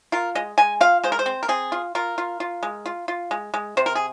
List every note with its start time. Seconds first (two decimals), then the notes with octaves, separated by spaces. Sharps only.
0.12 F4 A#4
0.35 G#3 D#5
0.58 G#3 G#5
0.81 F4 F5
1.04 G#3 C5
1.12 A#4
1.19 C5
1.26 C4
1.43 A#4
1.48 C4 G#4
1.72 F4
1.95 F4 A#4
2.18 F4
2.40 F4
2.63 G#3
2.86 F4
3.08 F4
3.31 G#3
3.54 G#3
3.77 C3 C5
3.86 A#4
3.95 G#4